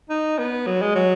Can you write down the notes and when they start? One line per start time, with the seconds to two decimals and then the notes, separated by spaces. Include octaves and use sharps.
0.10 D#4
0.38 B3
0.67 F#3
0.82 G#3
0.95 F#3